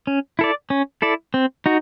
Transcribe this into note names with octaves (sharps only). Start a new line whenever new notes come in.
C#4
E4 A4 D5
C#4
E4 A4 D5
C4
D#4 F#4